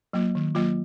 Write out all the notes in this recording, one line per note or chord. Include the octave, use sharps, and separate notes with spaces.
F#3 A#3 F4
D#3
F#3 A#3 F4